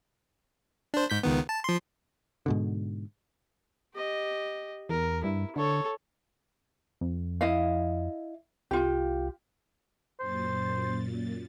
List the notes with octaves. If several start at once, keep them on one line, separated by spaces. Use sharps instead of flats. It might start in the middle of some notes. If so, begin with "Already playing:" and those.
D4 C5
G#2 G6 B6
C#2 D#3 B3
A5
F3 C6
G#2 B2 D3
G4 D#5
E2 A#4
G2 E4
D3 A4 C#5
F2
E4 D#5 F5
C2 F4 G4
F#2 A#2 C5 A6